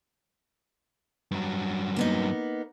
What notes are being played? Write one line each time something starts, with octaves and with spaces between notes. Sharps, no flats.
G2 F#3
A#3 B3 D#4